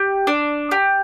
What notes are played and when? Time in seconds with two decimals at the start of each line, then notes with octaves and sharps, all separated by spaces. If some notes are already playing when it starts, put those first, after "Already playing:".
Already playing: G4
0.27 D4
0.71 G4